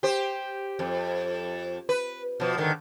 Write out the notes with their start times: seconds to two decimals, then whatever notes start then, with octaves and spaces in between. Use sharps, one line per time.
0.03 G4 C5
0.79 F2
1.89 B4
2.40 B2 F3
2.57 G#2 D3 D#3